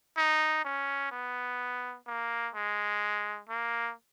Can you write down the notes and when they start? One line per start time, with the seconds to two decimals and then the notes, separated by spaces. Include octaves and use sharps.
0.17 D#4
0.64 C#4
1.11 B3
2.07 A#3
2.55 G#3
3.48 A#3